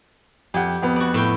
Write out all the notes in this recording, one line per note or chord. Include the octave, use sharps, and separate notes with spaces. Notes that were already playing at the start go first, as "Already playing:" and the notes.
F2 G4 F#5
F2 B3
F#4 D5
A2 G5